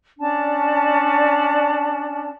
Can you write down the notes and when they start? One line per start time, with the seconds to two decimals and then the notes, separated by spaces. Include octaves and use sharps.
0.19 C#4 D4 D5 A5